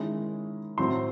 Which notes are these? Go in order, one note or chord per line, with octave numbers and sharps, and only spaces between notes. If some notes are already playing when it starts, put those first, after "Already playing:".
Already playing: D#3 G#3 C#4 E4
A2 F#3 C4 C6